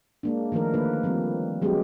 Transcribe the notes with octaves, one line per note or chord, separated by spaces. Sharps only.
G#3 A#3 D4
D#3 F3 A3 D#4 A#4
D3 D#3 A#3 B4
F3 G3 C4
F#3 G#3 B3 C#4 G4